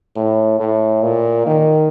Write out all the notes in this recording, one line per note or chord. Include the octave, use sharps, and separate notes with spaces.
A2
A2
A#2
D#3